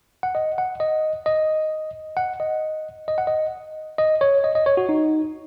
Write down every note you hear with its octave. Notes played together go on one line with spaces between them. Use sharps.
F#5
D#5
F#5
D#5
D#5
F#5
D#5
D#5
F#5
D#5
D#5
C#5
D#5
D#5
C#5
F#4
D#4